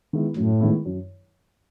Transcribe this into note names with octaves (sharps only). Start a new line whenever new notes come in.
D#3 G#3 B3 E4
F#2 A2
D#3 G#3 B3 E4
F#2